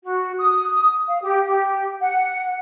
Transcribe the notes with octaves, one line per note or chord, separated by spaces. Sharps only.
F#4
D#6
F5
G4
G4
F#5